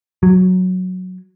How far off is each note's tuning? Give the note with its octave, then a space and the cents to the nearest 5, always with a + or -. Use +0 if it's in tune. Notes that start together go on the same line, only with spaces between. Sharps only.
F#3 -5